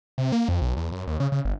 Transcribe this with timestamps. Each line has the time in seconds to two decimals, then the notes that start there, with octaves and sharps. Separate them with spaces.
0.18 C3
0.32 A#3
0.48 F2
0.61 B1
0.77 E2
0.92 F#2
1.07 D#2
1.20 C#3
1.32 C#3
1.45 G1